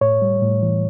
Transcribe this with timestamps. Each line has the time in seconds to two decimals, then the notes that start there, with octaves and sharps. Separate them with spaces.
0.01 A2 C#5
0.22 G3
0.42 A2
0.62 E3